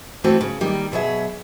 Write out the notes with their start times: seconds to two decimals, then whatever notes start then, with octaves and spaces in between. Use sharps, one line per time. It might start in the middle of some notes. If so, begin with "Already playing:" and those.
0.24 E3 A3 C4 C#4 E4 F#4
0.41 C#3
0.61 D#3 G3 A#3
0.92 B2 F#3 G#4 E5